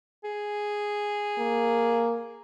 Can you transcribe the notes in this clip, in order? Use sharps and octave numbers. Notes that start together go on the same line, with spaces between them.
G#4
A#3